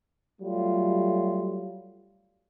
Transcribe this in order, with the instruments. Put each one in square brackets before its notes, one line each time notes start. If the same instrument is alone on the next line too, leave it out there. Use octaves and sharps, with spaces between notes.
[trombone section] F#3 G3 A3 F4